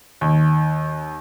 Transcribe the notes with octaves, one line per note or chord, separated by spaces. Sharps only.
D#2